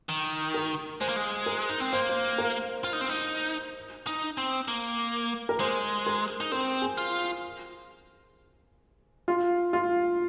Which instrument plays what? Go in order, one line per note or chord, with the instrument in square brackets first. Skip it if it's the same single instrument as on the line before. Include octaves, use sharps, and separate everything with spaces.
[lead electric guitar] D#3
[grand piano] A#4
[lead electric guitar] G#3 [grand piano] C5
[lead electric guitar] A#3
G#3
[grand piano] A#4
[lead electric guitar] D#4
C4
[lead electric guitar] A#3 [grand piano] C5
[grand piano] C5
A#4
[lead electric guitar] F4
D#4
C4
D#4
D#4
C4
A#3
[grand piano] A#4
[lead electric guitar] G#3 [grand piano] C5
[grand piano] A#4
[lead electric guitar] D#4
[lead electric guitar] C4 [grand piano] A#4
[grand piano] G#4
[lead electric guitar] F4
[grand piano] F4
F4